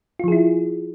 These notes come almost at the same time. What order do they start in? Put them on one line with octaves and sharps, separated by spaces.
F4 F3 G#4 E4